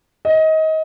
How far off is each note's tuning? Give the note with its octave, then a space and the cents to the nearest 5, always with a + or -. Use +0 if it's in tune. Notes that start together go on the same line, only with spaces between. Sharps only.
D#5 +25